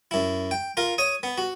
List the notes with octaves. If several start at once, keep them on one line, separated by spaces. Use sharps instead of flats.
F#2 E4
G5
F4 A#4
C#5 C#6 D#6
B3
F#4